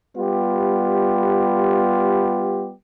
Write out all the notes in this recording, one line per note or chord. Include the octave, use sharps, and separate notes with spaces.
G3 B3 F4 G4